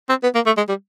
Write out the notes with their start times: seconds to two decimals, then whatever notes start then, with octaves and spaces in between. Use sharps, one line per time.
0.09 C4
0.23 B3
0.35 A#3
0.46 A3
0.57 G#3
0.68 G3